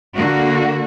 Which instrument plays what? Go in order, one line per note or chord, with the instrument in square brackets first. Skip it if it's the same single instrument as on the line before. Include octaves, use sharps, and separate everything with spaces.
[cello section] D3 A#3 F#4